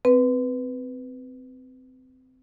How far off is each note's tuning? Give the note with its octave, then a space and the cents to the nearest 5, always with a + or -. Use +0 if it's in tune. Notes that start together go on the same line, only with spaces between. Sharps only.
C4 -20 B4 +0